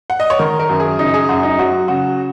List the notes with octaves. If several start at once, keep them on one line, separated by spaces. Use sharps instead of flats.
F#5
D#5
C#5
D#3 A#4
A#4
F#2
G#4
C#3 D#4
G#4
F#2 F#4
D#4
F#3 F#4
C#3 F#4